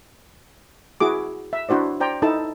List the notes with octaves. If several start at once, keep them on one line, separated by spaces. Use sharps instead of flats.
E4 F#4 G#4 D6
E5
D4 E4 F#4 C5 D5
C5 D5 G5 A#5
D#4 E4 A4 A5